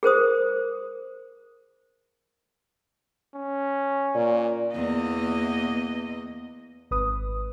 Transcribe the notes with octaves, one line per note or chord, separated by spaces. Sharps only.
G#4 A#4 C5 D#6
C#4
A#2 D5
E2 A#3 D#5
G#1 B4 D#6